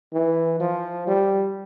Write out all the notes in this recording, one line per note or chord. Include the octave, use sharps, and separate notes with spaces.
E3
F3
G3